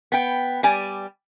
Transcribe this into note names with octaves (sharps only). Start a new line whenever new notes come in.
B3 G5
G3 D5 G#5